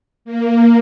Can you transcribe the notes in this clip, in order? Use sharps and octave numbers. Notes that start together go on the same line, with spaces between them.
A#3